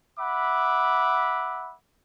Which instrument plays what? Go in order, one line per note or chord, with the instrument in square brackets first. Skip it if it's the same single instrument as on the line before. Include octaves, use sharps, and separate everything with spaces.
[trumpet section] E5 F#5 B5 D6